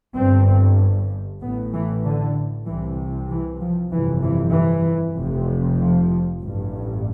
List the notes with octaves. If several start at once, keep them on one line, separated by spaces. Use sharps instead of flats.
G1 G2 C4
A1 A2 B3
E3
D3
C2 C3 E3
E3
F3
G1 F2 C3 E3
E3
E3
F1 F2 C3
F3
A1 G2